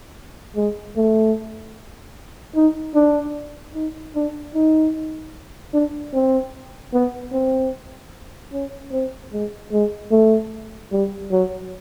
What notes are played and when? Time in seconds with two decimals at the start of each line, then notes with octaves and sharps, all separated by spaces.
0.56 G#3
0.96 A3
2.55 D#4
2.95 D4
3.74 D#4
4.15 D4
4.55 D#4
5.74 D4
6.14 C4
6.93 B3
7.32 C4
8.53 C#4
8.92 C4
9.33 G#3
9.72 G#3
10.11 A3
10.92 G3
11.32 F#3